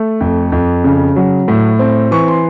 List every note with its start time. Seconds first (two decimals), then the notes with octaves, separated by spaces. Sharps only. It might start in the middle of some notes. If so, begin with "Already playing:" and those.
Already playing: A3
0.20 F2
0.52 F2
0.84 C#3
1.16 F#3
1.48 A2
1.79 C4
2.11 E3 C#6
2.28 C6